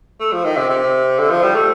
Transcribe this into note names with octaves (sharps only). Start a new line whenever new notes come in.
A3
F3
D#3
C3
C3
D3
F3
G3
A3